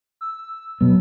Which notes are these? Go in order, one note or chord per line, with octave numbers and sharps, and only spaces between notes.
E6
B2 F#3 B3